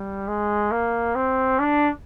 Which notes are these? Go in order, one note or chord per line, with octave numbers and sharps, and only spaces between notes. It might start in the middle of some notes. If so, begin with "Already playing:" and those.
Already playing: G3
G#3
A#3
C4
D4